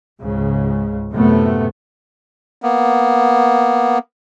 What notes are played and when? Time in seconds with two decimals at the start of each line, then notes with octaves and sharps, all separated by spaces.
0.21 C#2 G#2 C#3
1.13 F#2 A2 C3 A3 B3
2.62 A#3 B3